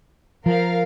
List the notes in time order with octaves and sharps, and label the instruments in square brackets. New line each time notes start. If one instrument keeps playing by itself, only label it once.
[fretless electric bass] F3 [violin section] A#4 F5